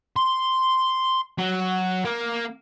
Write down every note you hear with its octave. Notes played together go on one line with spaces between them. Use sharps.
C6
F#3
A#3